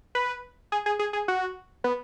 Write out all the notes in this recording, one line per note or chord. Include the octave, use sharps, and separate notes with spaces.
B4
G#4
G#4
G#4
G#4
F#4
B3